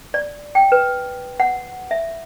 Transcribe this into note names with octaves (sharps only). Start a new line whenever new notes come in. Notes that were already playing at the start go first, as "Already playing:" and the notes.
D5
G5
B4
F#5
E5